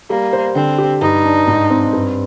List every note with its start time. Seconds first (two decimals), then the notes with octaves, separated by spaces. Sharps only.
0.10 G3 A#3
0.33 C5
0.55 D3 C4
0.78 G4
1.01 G2 D#4
1.25 D4
1.47 G#2
1.70 C4
1.93 G2